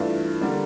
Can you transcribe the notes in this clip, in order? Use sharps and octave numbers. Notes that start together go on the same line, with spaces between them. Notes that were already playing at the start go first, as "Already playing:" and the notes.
Already playing: G2 E3 A3 D4 F4
D3 G3 A#3 D4